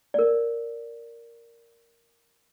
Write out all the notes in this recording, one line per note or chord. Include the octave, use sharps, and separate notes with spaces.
A#4 D5